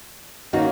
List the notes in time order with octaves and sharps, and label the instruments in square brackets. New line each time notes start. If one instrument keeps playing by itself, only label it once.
[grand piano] D#3 A#3 C#4 [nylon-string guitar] D#4 F#4